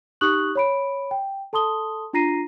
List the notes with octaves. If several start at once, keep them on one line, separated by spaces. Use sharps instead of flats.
D#4 G4 C#6 D#6 F#6 F#7
C#5 B5 D7
G5
A4 A5 C6 D#6 G7
D4 F4 A#5 A#6 C7 D#7